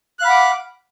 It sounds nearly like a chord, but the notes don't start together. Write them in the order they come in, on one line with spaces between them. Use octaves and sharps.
F#6 F5 B5 F#5 D6